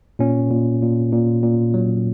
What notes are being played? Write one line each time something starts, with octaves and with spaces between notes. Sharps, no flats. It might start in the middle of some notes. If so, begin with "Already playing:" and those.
A#2 C#4
A#2
A#2
A#2
A#2
F#3